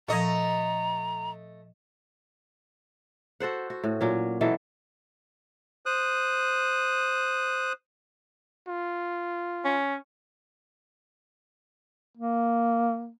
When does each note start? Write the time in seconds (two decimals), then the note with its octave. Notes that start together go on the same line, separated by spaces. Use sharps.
0.08 A#2 F3 A3 D#5 A#5
3.40 F#4 A4 C5 F#5
3.70 F#4
3.84 A2
4.01 A#2 F#3 C#4
4.41 B2 E3 F#3 A4
5.86 C5 D#6 F#6
8.68 F4
9.65 C#4
12.17 A#3